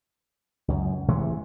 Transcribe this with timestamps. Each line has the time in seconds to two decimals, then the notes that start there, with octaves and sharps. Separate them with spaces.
0.68 C#2 F#2
1.08 C3 E3 G#3 A3